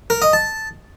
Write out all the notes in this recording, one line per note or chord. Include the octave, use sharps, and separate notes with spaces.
A#4
D#5
A5